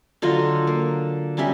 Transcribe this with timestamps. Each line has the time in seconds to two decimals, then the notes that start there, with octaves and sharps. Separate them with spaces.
0.22 D3 F#3 F4 D#5
0.67 A#3
1.37 F#3 G3 C#4 E5